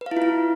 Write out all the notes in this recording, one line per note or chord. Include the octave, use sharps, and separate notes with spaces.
B4
F5
E4
F4
E4